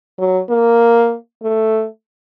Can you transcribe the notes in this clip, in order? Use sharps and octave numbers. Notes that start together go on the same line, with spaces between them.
F#3
A#3
A3